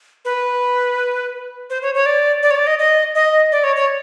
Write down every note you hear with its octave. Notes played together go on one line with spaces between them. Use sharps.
B4
C5
C#5
C#5
D5
D5
C#5
D5
D#5
D#5
D#5
D5
C#5
C#5